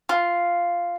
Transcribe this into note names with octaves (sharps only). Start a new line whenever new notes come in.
F4